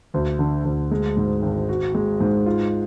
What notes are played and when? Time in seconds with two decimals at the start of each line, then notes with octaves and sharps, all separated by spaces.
0.14 D2
0.39 D3
0.65 D2
0.91 G#3
1.17 G#2
1.42 G#1
1.69 F#4
1.95 G#3
2.20 G#2
2.46 F4